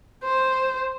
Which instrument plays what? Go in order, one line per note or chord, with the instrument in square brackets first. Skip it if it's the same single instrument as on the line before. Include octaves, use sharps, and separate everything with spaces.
[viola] C5